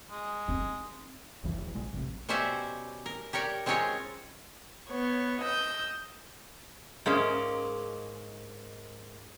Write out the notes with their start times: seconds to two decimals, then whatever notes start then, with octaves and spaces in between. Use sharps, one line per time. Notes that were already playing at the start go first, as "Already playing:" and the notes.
0.11 G#3
0.48 C4 D#4
1.43 F#1 C#2 E3 F3
1.58 E1
1.75 A#1 G#3
1.93 A1 F2 C3
2.29 B2 C#4 G4 C5 D5 E5
3.06 A#4
3.33 G4 A#4 C#5 D5
3.66 G#3 C4 C#4 F4 A#4 C#5
4.89 B3 C#5
5.41 D#5 E6 G6
7.06 G#2 G#3 A#3 C#4